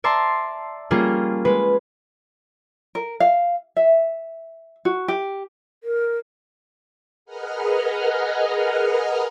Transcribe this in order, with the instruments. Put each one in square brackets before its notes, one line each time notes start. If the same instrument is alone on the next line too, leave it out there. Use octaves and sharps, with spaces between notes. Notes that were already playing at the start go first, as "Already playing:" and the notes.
[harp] D5 E5 A5 A#5 C6
G3 A#3 C#4 F4 G#4
G#3 B4
[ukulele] A#4
F5
E5
F#4
G4
[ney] A#4
[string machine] G#4 A#4 B4 D#5 F#5 F6